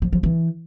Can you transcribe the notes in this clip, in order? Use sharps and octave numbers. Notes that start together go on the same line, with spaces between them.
F3
F3
E3